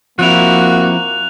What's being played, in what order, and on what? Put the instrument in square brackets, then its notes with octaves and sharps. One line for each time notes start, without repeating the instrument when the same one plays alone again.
[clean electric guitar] F3 C4 E4 [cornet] A#3 [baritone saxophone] F#4 [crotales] F#6 F7